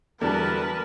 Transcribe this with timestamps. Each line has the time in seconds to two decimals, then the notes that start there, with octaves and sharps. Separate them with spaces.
0.21 E2 D3 F#3 G3 A#4 B4 D5 A5